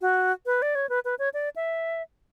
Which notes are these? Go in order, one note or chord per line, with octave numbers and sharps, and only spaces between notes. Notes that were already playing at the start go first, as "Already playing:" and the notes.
F#4
B4
D5
C#5
B4
B4
C#5
D5
E5